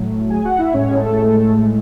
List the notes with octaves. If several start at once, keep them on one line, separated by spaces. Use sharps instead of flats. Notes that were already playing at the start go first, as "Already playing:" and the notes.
Already playing: A2 F#3 A3
G#4 G#5
F#4 F#5
E4 E5
A2 G#3 C#4 C#5
G#4
A3 A4